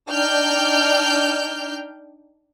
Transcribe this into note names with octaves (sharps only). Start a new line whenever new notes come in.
D4 D#4 G5 F6 G6